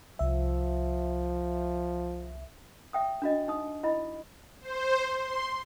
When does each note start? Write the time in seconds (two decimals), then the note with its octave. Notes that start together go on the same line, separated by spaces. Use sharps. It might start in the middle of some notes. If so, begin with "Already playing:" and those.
0.19 C2 F3 E5
2.93 E5 G5 D#6
3.22 D4 F#4 D#5
3.48 D#4 D#6
3.83 E4 D#5 B5
4.61 C5
5.14 C6